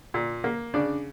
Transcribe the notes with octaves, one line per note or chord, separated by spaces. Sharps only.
A#2
A#3
C#3 D4 D5